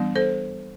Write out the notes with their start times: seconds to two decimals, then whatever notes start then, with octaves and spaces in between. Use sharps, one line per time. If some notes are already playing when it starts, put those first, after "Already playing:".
Already playing: E3 G3 B3 D4
0.16 A4 C5